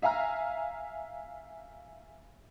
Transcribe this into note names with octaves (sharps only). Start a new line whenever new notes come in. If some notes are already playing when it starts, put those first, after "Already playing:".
E5 F5 G#5 A#5 F6